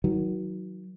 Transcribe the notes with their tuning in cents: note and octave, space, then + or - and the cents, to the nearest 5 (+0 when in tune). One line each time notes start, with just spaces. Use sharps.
D#3 +40 F#3 +0